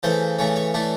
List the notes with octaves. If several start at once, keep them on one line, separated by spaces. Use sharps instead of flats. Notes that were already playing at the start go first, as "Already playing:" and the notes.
C#3 E3 A3 C5
C#3 E3 A3 C#5
C#5
E3 A3 D4